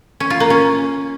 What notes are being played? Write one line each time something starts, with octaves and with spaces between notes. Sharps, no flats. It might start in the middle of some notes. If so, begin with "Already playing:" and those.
C#4
F4
A#3
C#4